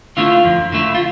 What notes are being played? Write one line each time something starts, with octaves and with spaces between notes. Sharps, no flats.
D3 A3 E4 F4
F2
D3 A3 E4
F4